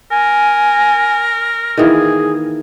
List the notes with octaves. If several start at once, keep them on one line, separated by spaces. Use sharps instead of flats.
A#4 G#5
D#3 E3 A#3 G#4